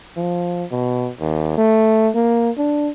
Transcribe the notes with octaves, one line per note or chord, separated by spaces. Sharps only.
F3
B2
D#2
A3
A#3
D4